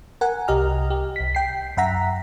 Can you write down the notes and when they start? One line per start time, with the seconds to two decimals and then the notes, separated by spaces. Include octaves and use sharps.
0.21 A#4 F#5 G#5
0.48 C2 G4 D#5 A#5 F6
0.90 G4
1.16 C2 B6
1.35 G5 C7
1.77 F#2 E5 F#5 A#5 B6